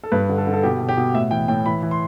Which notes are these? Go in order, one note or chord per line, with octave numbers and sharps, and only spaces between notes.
A4
G2 B4
D3
A4
D3
A4
B2 G4
B2
G4
B2
A2 E5
E3 G5
A2 G5
E3 B5
E3
C6